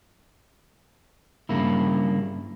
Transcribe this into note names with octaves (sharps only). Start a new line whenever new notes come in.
G2 C#3 A#3 E4